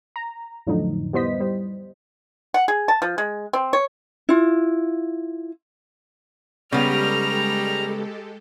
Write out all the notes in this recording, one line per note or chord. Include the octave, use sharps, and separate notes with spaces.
A#5
F2 A2 D3 F3 F#3 D#4
G3 B3 E4 C5 D#5 B6
G3 C5
F#5
G#4
A5
F3
G#3
C4
C#5
E4 F4
C#3 G3 G#3 B3 G4 A4 A#5 F6